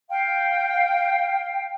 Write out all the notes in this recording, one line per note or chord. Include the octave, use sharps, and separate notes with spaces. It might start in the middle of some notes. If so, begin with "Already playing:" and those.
F5 G5